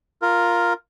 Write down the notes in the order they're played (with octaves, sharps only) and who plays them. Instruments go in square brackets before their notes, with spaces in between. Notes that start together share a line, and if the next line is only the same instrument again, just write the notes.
[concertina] F4 A#4